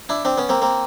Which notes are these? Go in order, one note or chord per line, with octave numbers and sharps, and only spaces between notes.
D4 E4
C4 D4
B3 C#4
A#3 C4
A#3 C4